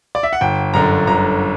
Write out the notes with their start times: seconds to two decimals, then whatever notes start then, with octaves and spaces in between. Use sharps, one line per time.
0.15 D5
0.23 E5
0.33 F#5
0.41 G1 G5
0.74 F#2 D3 A#5
1.07 G1 A#5